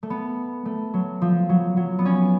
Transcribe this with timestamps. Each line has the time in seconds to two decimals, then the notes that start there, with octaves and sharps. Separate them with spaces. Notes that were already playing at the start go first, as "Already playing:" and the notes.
0.03 A3
0.10 B3
0.65 A3
0.94 F#3
1.22 F3
1.49 F#3
1.77 F#3
1.99 B3
2.05 C#4